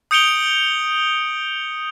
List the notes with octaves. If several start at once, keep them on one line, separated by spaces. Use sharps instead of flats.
D#6 G6 C#7 D7 F7 G7